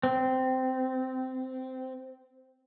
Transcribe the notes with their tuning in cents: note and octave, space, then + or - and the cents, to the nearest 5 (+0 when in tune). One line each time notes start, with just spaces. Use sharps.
C4 -15